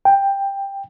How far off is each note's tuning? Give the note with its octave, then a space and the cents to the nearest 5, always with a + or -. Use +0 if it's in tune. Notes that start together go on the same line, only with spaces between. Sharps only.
G5 +10